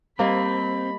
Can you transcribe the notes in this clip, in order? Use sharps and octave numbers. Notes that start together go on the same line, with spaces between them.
G3 A#3 C4 G4 D#5 B5